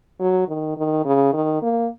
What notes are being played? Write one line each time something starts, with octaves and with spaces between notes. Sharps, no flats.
F#3
D#3
D#3
C#3
D#3
A#3